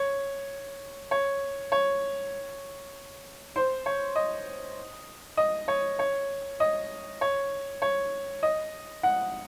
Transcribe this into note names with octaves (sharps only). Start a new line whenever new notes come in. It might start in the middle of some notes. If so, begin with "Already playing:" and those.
Already playing: C#5
C#5
C#5
C5
C#5
D#5
D#5
C#5
C#5
D#5
C#5
C#5
D#5
F#5